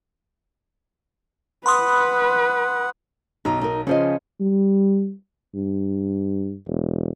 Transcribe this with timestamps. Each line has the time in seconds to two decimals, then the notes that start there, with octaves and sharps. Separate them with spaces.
1.66 B4 F#5 B5 C6 D#6
3.45 B1 D#4 A#5
3.61 D#4 A#4
3.87 C#3 F3 C#4 C5 D#5
4.41 G3
5.55 G2
6.67 E1